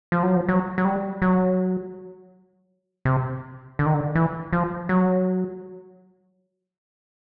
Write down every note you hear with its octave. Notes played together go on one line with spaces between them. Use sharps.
F3
F#3
F3
F#3
F#3
G3
F#3
C3
D3
D#3
D3
E3
F3
F#3